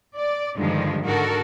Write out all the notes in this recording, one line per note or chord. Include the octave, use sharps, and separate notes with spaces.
D5
G2 D3 D#3 F3 G#3
G#2 D3 F#4 A4 A#4